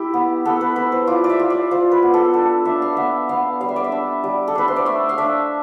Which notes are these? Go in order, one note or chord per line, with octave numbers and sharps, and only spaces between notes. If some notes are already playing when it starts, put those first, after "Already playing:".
Already playing: E4 G4
B3
B3 A4
B4
E4 B4
C5
F4 D5
D5
E5
F4
D5
F4 C5
B4
B3
A4
D4 A4
D4 E5
F5
B3 E5
B3 F5
G3 F5
E5
D5
E5
D4
G3
A4
D4 B4
C5
D5
A3 E5
F5
D4 E5